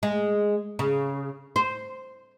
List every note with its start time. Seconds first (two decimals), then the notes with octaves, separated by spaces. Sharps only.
0.03 G#3
0.79 C#3
1.56 C5